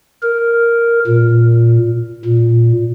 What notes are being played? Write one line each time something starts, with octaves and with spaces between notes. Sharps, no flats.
A#4
A#2
A#2